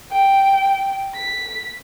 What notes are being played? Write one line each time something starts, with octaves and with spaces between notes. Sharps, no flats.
G5
B6